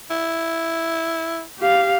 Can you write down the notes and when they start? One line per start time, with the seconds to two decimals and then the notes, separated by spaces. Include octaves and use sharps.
0.10 E4
1.59 G4 F5